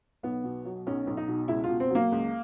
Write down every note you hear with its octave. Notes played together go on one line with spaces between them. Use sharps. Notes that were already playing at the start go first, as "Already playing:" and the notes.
B1 B3
B2
F#3
B1 C#4
B1
D#4
B2
C#2 E4
F4
B2
C4
F#3 A#3
C#2